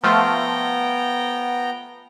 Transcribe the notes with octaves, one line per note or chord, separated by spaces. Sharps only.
F3 A3 B3 F4 G5 A#5